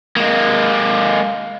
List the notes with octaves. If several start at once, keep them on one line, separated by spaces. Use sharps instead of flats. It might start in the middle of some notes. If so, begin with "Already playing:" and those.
G#3 A#3